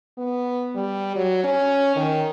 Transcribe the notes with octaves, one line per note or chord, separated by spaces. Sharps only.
B3
G3
F#3
C#4
D#3